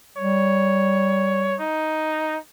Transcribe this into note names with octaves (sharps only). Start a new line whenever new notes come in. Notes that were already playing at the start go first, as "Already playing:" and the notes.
G3 C#5
D#4